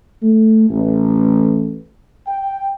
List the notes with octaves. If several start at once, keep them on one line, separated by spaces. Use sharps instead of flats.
A3
A1
G5